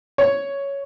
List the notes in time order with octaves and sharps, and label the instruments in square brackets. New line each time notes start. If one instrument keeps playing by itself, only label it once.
[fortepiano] C#5